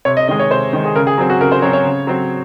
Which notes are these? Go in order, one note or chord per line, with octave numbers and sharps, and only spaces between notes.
C3 C#5
D#5
D#3 G#3 D#5
C#5
C3 C5
D#3 G#3
G#4
C#3 A#4
G#4
F#3 C4
F#4
C#3 A#4
C5
F#3 C4 C#5
C#5
C#3
F#3 C4